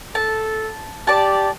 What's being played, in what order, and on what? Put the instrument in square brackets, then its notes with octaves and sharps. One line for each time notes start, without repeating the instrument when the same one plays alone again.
[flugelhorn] A4 [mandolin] A5
[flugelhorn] G4 [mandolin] D5 A5